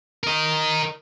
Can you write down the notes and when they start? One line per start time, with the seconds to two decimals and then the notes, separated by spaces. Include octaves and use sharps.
0.24 A#4 D#5